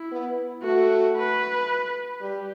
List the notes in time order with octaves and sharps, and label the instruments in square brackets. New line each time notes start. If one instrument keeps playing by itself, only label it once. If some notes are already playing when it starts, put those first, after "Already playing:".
Already playing: [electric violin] E4
[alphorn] B3
[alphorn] A3 [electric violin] F#4
[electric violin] B4
[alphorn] G3 [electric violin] G4